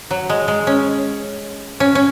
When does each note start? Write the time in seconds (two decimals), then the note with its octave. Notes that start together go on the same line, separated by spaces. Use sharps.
0.11 F#3
0.29 G#3
0.48 G#3
0.67 C#4
1.80 C#4
1.95 C#4